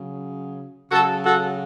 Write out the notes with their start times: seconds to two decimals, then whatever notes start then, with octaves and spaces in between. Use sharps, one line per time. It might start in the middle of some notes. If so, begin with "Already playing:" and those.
Already playing: C#3 F#3
0.91 C#3 F#3 F#4 A4
1.25 F#4 A4